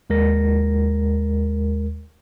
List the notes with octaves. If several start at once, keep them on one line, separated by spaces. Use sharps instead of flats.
D#2 G#3 A#4 A#6